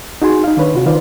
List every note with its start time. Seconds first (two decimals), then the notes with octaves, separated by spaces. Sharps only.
0.22 D#4 F#4 G#4 G#5 C6
0.44 D#4 F5
0.57 D#3 D4 B4 C#5
0.74 C3 F4 F#4
0.86 D#3 F4 B4 C5 D5